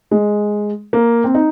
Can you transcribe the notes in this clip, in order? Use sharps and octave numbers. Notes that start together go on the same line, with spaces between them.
G#3
A#3
C4
D#4